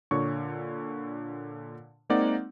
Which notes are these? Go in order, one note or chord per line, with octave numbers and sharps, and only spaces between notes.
A#2 D3 C#5 C#6
G#3 A#3 C4 D#4 D5 F#5